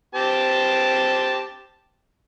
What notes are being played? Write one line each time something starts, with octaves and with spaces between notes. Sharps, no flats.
C4 G4 A5